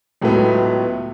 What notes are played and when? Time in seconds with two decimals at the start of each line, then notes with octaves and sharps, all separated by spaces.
0.21 C#2 A2 F#3 A3 B3